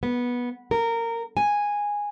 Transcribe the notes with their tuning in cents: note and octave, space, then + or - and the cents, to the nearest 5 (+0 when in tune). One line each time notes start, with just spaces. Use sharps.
B3 -15
A#4 -20
G#5 -10